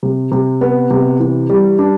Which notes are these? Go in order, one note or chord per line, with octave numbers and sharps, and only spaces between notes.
C3
C3
B3
C3
E3
G3
D4